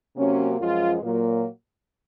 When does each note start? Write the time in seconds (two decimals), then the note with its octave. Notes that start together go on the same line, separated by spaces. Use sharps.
0.17 C3 F#3 A#3 C#4
0.60 F#2 F3 G#3 F4
1.02 A#2 F#3 A#3